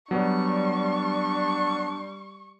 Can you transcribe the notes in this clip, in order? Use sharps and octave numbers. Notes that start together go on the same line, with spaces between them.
F#3 G3 B3 D4 C#6